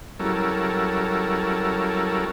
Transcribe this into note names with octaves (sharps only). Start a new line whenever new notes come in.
F#3 G3 C#4 E4 A4 A#4